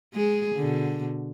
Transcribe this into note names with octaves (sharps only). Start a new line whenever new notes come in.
G#3 G#4
B2 D3